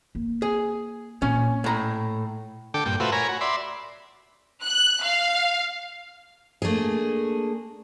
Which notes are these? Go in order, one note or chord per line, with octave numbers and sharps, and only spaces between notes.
A#3
G#4
A#2 C#4
A2 A#5
D3 A4 G5 D6
G2 A#2 G5
A3 F4 F#4 B4 C5 E5
A#4 C#5 G#5 A#5 B5
F#4
D5 E5 B5 C6
F#6
F5
A3 A#3 D4 G#4